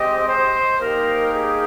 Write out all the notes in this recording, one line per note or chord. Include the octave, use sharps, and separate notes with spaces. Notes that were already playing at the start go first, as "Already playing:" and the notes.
Already playing: G#3 C4 G4 D#5
C5
A#3 D#4 G4 A#4
G#4